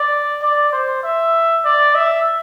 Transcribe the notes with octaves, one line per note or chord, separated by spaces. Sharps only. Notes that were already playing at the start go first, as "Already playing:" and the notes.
Already playing: D5
D5
C5
E5
D5
E5